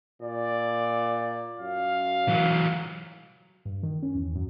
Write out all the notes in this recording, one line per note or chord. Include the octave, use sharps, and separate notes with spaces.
A#2 D5
F#2 F5
E3 F#3
G2
D#3
C#4
E2
F#2